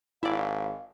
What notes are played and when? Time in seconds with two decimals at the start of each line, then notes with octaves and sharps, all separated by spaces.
0.23 G#1 E4 D5 F5